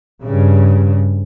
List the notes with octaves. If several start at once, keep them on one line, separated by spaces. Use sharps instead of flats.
G2 C#3